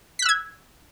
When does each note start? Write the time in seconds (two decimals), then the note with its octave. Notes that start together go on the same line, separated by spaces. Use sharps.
0.19 B6
0.22 F#6
0.26 E6
0.29 G#6